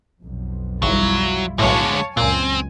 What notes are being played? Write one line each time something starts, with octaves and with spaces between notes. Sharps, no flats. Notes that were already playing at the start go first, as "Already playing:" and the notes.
B1 F2
G#1 F#3 G3 E4 F4
B1 A2 D3 G#3 C#5 F5 A5
F#1 C#2 A#2 C4 G#5